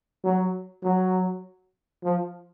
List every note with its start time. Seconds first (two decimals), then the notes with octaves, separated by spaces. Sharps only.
0.24 F#3
0.83 F#3
2.03 F3